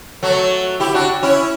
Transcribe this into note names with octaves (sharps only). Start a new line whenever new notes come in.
F#3 A3
E4 G4
D4 F#4
C#4 E4